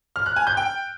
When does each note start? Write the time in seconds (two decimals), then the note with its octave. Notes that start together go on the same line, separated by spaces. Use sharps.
0.16 F6
0.26 F#6
0.36 G#5
0.47 G6
0.57 G5